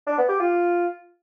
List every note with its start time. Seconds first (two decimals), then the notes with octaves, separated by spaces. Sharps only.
0.07 D4
0.18 B3
0.29 G4
0.40 F4